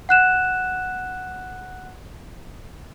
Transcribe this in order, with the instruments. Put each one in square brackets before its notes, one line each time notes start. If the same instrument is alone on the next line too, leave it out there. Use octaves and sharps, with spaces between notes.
[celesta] F#5 F#6 E7